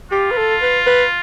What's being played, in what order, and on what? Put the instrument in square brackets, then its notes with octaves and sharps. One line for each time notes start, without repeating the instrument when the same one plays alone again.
[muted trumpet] F4 [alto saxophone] G4
[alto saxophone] B4
A4
B4
B4